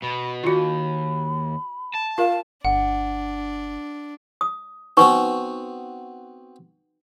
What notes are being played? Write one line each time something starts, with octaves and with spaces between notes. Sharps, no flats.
B2 B5
D#2 F4 F#4 B5
A5
F4 A#4 F5
G1 D4 F#5
D#6
B3 C4 D#4 F#4 B4 C#6